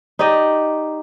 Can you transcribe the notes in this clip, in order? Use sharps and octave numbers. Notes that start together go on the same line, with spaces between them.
D#4 G4 D5 D#5